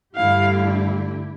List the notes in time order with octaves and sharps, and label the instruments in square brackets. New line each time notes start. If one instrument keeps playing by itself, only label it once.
[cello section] G2 D3 A3 E4 G4 [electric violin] F5